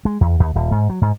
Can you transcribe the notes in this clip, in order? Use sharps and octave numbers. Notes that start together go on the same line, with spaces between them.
G#3
E2
D#2
D#1
G#2
F#3
G#2